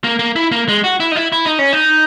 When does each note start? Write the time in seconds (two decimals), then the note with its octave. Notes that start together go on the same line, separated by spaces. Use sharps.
0.04 A#3
0.19 A#3
0.36 E4
0.52 A#3
0.68 G#3
0.84 F#4
1.00 E4
1.12 D#4
1.16 E4
1.32 E4
1.45 D#4
1.59 C#4
1.73 D#4